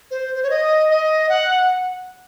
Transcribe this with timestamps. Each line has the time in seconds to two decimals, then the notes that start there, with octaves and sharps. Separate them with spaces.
0.11 C5
0.35 C5
0.43 C#5
0.50 D#5
0.90 D#5
1.29 F#5